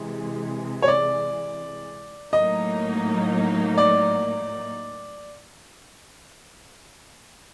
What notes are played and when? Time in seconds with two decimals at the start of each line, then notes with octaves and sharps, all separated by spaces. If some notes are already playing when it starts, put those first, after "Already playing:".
Already playing: C3 E3 G#3
0.82 C#5
0.88 D5
2.33 A2 F#3 A#3 D#4 D#5
3.78 D5